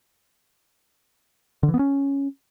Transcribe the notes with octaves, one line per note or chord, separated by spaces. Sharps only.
D3
E3
B3
C#4